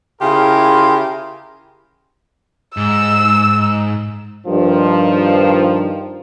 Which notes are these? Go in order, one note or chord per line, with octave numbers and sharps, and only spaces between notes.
C#3 E4 F4 G4 G#4 A#4
G#2 E6
G2 D#3 F3